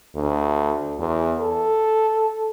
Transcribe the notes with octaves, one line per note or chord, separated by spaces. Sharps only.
D2
E2
A4